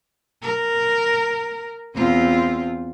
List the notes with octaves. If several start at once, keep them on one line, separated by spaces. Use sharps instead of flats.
A#4
E2 C4 F4